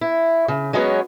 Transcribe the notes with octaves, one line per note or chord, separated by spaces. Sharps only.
E4
C#3
F#3 G#3 B3 C#4 A4 C#5